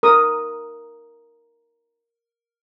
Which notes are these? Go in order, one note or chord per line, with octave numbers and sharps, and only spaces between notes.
A#4 D#6